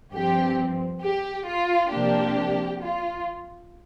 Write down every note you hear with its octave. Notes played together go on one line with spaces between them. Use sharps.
G2 F3 C4 G4
G4
F4
C3 F3 A#3 D4 G4
F4